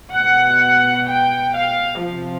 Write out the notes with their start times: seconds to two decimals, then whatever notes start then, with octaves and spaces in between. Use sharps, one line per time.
0.13 B2 F#5
1.08 G5
1.54 F5
2.02 C3 F3